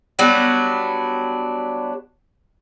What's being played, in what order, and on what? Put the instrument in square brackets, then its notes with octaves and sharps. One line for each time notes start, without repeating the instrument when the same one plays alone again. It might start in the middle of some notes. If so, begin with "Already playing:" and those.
[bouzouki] F#3 G3 B3 D4